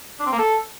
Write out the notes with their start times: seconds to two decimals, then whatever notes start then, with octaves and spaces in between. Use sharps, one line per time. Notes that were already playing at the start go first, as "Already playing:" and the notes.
0.20 D4
0.26 C4
0.32 A#3
0.39 A4